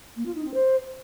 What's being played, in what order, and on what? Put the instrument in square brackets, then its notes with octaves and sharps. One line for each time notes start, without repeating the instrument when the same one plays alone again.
[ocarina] A#3
F4
D#4
C4
C5